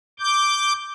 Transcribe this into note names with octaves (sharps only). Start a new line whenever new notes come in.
D6 G6